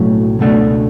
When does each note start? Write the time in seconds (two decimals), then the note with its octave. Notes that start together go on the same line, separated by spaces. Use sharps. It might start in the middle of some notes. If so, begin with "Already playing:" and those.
Already playing: B1 A2 F#3 A3 C#4
0.39 C#2 B2 A3 D4